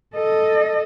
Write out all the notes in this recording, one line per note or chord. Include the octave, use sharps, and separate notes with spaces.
A4 D#5